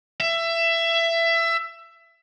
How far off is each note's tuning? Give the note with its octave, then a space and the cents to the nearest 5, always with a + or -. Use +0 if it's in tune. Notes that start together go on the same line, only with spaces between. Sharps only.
E5 +20